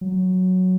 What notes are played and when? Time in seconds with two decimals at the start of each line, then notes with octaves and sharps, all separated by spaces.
0.01 F#3